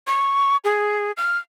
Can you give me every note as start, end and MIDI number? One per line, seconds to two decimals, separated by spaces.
0.07 0.57 85
0.64 1.12 68
1.17 1.38 89